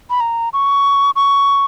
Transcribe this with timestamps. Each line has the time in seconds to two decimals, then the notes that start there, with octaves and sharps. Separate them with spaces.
0.10 B5
0.20 A#5
0.53 C#6
1.16 C#6